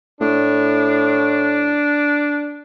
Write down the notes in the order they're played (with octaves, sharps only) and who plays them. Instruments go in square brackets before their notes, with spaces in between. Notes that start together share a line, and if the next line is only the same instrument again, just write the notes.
[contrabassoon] A2 [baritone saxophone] D4